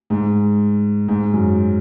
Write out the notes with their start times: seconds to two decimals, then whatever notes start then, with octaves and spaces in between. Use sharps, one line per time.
0.10 G#2
1.08 G#2
1.34 F#2